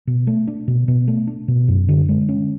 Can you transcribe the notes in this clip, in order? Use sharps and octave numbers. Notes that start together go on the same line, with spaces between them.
B2
A3
D4
B2
B2
A3
D4
B2
F#2
D3
G#3
C#4